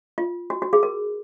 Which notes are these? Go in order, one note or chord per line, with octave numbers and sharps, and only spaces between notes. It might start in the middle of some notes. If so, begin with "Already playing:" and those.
F4
F#4
F#4
G#4
A#4